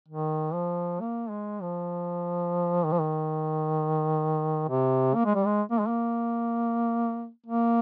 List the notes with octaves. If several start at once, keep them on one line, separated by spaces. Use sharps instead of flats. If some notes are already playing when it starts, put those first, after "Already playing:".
D#3
F3
A#3
G#3
F3
D#3
F3
D#3
C3
A#3
G#3
G3
G#3
A#3
G#3
A#3
A#3